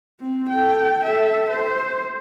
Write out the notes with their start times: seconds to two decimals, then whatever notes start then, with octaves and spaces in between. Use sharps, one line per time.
0.20 C4
0.49 A4 G5
1.04 A4 E5
1.50 C5